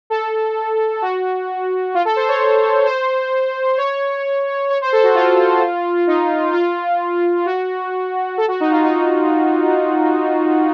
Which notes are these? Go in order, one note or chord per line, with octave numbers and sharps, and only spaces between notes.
A4
F#4
F4
A4
C5
C#5
C5
C#5
C#5
C5
A4
F#4
F4
D#4
F4
F#4
A4
F#4
D#4
F4
D#4